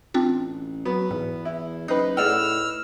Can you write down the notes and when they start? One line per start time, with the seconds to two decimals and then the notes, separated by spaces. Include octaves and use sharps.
0.14 A1 C4 D4 F4
0.85 F#3 B3
1.11 E2 G#2
1.45 E4
1.88 F#1 D#4 B4 D#6 F#6 C7
2.17 A2 G#4 D5 F#5 E6 F6